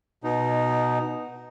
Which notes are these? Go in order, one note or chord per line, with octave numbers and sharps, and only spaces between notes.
B2 D#4